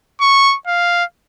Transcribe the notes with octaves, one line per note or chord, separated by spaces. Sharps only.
C#6
F5